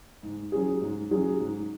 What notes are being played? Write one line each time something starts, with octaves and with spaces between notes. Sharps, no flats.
G#2
F#3 C#4 G#4
G#2
F#3 C#4 G#4
G#2